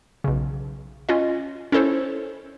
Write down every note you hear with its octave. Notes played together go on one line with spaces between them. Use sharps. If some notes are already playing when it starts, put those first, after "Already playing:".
B1 C#3
C#4 F4 D#5
C#4 E4 A4 C5 C#5